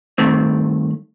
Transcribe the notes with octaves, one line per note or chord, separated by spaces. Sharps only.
G2 D#3 A3 C4